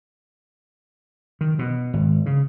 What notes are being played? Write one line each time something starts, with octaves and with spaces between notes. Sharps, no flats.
D#3
B2
G#1
C#3